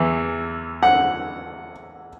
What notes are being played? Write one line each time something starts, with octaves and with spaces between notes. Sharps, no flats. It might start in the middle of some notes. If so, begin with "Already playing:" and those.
Already playing: E2 E3
F#5